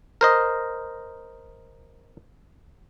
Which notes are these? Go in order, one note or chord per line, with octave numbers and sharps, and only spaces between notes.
A#4 C5 D#5